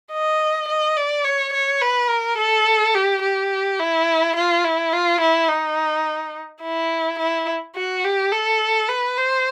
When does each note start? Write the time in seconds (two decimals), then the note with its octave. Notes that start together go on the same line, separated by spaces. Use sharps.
0.12 D#5
0.68 D#5
0.97 D5
1.25 C#5
1.54 C#5
1.82 B4
2.09 A#4
2.38 A4
2.95 G4
3.22 G4
3.79 E4
4.36 F4
4.64 E4
4.93 F4
5.21 E4
5.49 D#4
6.62 E4
7.20 E4
7.76 F#4
8.05 G4
8.32 A4
8.89 B4
9.18 C5